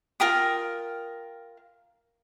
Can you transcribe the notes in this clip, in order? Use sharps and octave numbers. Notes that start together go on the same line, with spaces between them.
F4 A#4 G5 D#6